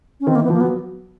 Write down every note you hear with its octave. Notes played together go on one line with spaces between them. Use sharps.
C#4
D#3 C4
A#3
E3
B3
F3 A#3
F#3 B3